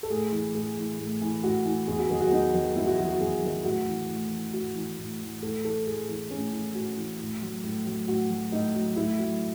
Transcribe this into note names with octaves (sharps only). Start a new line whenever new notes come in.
A4
A2 G#4
E3
A2 G#4
E3
A2
E3
A2 F#4
E3
E2 G#4
F#4
D#3 F#3 G#4
F#4
E2 D#4
D#3 F#3
E2 E4
F#4
D#3 F#3 F#4
F#4
E2 G#4
D#3 F#3
A2 F#4
E3
A2
E3
A2 F#4
E3
A2
E3
A2 A4
E3 A4
A2 G#4
E3
A2 C#4
E3
A2 F#4
E3
A2
F#3
A2
F#3
A2 F#4
F#3
A2 D#4
F#3
A2 E4
F#3